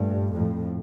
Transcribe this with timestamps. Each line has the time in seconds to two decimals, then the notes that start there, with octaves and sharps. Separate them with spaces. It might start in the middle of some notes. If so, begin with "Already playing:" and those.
Already playing: G2 A#2 A3
0.33 F2 A2